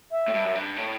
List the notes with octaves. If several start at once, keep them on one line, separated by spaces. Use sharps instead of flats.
E5
A2
G2
F#2
G2
A2